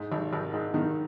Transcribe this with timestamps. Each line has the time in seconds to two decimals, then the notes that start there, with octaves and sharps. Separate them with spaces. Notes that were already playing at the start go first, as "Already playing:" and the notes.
Already playing: G#2
0.12 G#1
0.33 G#1
0.53 G#2
0.74 D#3